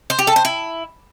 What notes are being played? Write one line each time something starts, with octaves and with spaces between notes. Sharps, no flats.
C5
G4
A4
C5
E4